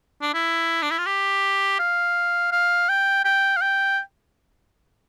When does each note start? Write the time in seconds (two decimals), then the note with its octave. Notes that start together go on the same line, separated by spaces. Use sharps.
0.22 D4
0.34 E4
0.82 D4
0.91 E4
0.98 F4
1.06 G4
1.79 F5
2.52 F5
2.89 G5
3.25 G5
3.56 F5
3.61 G5